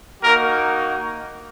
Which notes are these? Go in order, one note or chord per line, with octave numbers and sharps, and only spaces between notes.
A#3 D#4 F#4 A#4